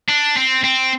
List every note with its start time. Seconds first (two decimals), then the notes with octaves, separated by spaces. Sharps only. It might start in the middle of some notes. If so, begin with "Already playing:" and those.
0.08 D4
0.36 C4
0.64 C4